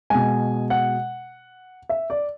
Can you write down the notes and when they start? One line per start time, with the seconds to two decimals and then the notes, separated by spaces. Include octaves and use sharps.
0.10 B2 G#3 G#5
0.70 F#5
1.89 E5
2.10 D5